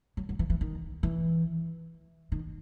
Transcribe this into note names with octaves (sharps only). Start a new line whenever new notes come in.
F#3
F#3
E3
E3
D#3
E3
D#3